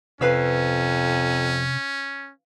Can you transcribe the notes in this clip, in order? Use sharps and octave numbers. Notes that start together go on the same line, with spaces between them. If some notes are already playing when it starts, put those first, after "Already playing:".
F2 C3 C#4 B4 F5 E6